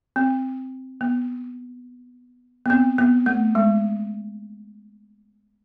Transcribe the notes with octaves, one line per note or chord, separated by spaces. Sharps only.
C4
B3
B3
C4
B3
A3
G#3